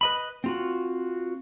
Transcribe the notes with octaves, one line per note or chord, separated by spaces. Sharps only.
B4 D#5 B5
C4 F4 F#4